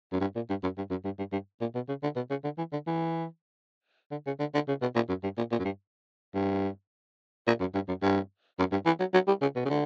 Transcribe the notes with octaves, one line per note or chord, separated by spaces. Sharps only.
F#2
G2
A#2
G2
F#2
G2
F#2
G2
G2
G2
A#2
B2
C#3
D3
B2
C#3
D3
E3
D3
E3
D3
C#3
D3
D3
C#3
B2
A#2
F#2
G2
A#2
A#2
F#2
G2
G2
A#2
F#2
G2
F#2
G2
F#2
G2
E3
F#3
F#3
G3
C#3
B2
C#3
D3